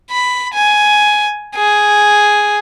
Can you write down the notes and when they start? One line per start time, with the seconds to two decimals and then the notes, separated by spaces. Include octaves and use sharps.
0.11 B5
0.54 G#5
1.56 G#4